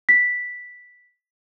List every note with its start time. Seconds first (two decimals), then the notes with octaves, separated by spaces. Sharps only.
0.09 B6